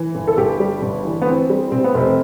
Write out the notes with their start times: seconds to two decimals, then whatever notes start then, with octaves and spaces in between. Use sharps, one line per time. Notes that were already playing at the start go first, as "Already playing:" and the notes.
Already playing: E3
0.15 G1
0.28 A4
0.37 G1 G4
0.60 G3
0.82 G1
1.05 E3
1.22 B3
1.27 E3 C4
1.50 G3
1.72 C3 C4
1.84 B3
1.94 F1 C4